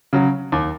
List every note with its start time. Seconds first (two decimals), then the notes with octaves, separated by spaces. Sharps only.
0.13 C#3 F#3
0.52 D#2